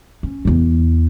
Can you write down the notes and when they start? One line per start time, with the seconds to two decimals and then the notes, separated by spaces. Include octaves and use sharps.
0.23 C#4
0.45 E2 E3